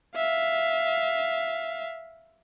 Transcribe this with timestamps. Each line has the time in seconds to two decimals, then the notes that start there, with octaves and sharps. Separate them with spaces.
0.16 E5 F5